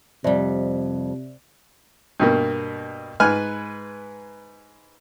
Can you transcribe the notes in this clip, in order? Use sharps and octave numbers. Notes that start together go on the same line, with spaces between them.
F2 C3 G3 C5 D5 E5
G2 B2 A#3
G#2 B4 G#5 F6